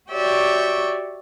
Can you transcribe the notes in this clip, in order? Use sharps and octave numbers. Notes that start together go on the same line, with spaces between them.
F#4 G4 C#5 D5 E5 G5